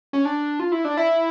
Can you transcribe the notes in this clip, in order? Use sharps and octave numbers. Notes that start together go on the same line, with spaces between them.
C#4
D4
F4
E4
D4
E4